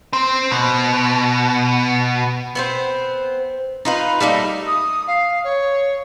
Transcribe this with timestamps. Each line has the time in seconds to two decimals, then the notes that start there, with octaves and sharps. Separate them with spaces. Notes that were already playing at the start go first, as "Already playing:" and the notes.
0.13 C4
0.51 B2
2.55 B3 C4 C5
3.85 D#4 F4 B4
4.20 G3 A3 A#3 D#4
4.67 D#6
5.07 F5
5.44 C#5